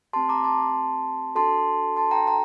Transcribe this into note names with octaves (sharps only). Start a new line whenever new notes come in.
A3 C4 G4 A5 C6
A#5 D6
A5 C6
D4 F#4 A4 A5 C6
A5 C6
G5 A#5
G5 A#5